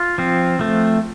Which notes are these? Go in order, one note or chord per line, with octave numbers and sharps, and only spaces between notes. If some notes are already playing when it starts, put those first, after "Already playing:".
Already playing: F4
F3 C4
F3 A3 C4